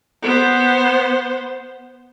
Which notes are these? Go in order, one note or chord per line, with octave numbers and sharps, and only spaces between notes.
B3 C5